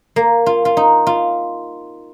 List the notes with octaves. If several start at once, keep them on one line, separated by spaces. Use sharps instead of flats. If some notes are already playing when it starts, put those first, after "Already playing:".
A#3
F4
F4
D#4
F4